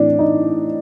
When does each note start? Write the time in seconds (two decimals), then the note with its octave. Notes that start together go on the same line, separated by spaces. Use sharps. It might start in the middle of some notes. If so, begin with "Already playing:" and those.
Already playing: A2 E3 A3 C4 D4
0.19 D#4